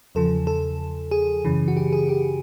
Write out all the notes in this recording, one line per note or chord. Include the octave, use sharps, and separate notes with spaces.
E2 C#3 F3 A4
A4
G#4
F#2 C#3 E3
F#4
G4
G#4
G4